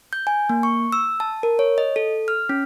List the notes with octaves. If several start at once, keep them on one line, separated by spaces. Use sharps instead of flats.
G6
G#5
A#3
C#6
E6
A5
A#4
C#5
D#5
A4
F6
C#4